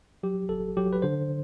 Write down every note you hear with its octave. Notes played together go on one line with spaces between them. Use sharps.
F#3 G4
G1 A4
F#3 G4
B4
D3 C5